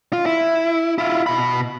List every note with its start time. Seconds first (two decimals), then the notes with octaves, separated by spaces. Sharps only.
0.13 F4
0.26 E4
0.98 E4 F4
1.27 B2 B5